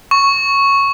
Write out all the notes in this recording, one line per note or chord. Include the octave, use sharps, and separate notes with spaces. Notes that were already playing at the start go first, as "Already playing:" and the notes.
C#6